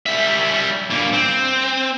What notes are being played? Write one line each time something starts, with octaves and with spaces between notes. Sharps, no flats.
G3 E5
G2 A#3
C4